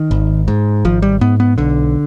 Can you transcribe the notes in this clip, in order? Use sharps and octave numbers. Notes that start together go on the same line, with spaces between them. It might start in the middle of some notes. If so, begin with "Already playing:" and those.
Already playing: D#3
G#1
G#2
G#1 F3
G3
G#2 B3
B3
B1 D3